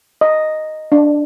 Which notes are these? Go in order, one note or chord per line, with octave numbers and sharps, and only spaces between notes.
D#5
D4